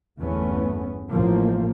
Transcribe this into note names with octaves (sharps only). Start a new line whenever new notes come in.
G1 E2 A3 B3 C#4
A1 F3 A#3